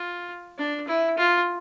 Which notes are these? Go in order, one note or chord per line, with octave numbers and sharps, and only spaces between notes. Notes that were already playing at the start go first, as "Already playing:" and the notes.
Already playing: F4
D4
E4
F4